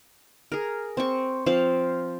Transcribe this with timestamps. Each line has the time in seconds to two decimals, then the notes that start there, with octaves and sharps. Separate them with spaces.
0.52 G#4 A#4
0.97 C4 C#6
1.46 F3 C4 F5